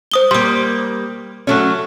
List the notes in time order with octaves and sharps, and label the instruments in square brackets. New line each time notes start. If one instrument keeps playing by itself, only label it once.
[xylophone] C5 D#6 G7
[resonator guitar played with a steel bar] G3 A#3 [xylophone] C6 D#6
[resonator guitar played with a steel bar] F#3 A3 C#4